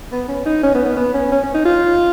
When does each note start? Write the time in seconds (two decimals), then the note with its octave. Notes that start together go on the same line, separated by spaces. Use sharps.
0.12 B3
0.29 C#4
0.46 D#4
0.63 C#4
0.75 B3
0.85 B3
0.97 B3
1.14 C#4
1.32 C#4
1.43 C#4
1.54 D#4
1.65 F4